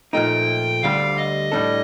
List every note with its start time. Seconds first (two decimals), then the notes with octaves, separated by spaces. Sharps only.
0.13 A#2 F3 A3 D#4 G5
0.83 D2 D3 G3 F5
1.17 D#5
1.52 A2 G3 D4 A4